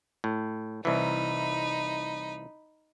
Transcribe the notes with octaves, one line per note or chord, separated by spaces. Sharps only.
A2
C2 E3 D#4 B5